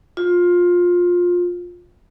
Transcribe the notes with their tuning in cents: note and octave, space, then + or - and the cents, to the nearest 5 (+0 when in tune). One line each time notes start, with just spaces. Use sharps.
F4 +20